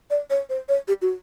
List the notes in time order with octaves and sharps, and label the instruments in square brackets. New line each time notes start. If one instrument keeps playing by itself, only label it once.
[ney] D5
C#5
C5
C#5
G4
F#4